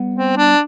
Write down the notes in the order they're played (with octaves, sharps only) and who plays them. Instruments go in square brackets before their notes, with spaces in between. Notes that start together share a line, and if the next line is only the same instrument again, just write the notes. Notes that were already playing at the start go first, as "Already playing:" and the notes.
Already playing: [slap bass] G3 B3
[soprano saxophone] C4
D4